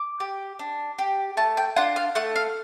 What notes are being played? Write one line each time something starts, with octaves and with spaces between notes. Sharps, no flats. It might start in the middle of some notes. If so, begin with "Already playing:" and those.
Already playing: D6
G4
D4
G4
A3 A5
G5
D4 F4 F#5
F5
A3 F#5
F5